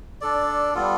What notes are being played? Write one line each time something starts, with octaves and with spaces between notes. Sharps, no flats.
D4 A4 D5
G3 B3 F4 A4